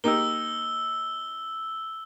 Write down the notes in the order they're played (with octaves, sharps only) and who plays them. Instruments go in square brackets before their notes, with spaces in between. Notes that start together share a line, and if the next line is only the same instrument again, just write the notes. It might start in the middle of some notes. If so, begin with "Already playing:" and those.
[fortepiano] A#3 D#4 G4 [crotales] E6 G7